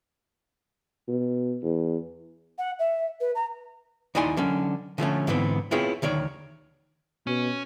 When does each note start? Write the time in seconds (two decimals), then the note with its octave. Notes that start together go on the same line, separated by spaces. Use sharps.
1.08 B2
1.63 E2
2.58 F#5
2.79 E5
3.20 B4
3.35 A#5
4.15 D#2 D#4 E4 D5 G#5 C6
4.37 D3 F#3 C#4
4.98 D3 F3 A3 C#4
5.27 G#2 D3 E3 B3 C4
5.71 B3 C4 E4 F4 G#4 C#5
6.02 D2 D#3 C#5 D5
7.27 B2 C#4